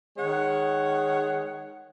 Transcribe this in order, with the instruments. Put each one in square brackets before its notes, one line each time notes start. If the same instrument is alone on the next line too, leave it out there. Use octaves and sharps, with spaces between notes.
[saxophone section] D#3 G#3 C#5 F#5